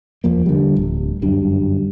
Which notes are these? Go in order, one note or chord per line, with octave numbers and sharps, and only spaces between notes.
F1 E2 F3 A#3
D3 G3
D1
G1 F#2 G3 D4